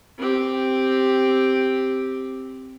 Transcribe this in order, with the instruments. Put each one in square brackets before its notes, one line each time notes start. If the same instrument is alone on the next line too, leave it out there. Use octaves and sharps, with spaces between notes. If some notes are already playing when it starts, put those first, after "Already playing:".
[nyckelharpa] C4 G4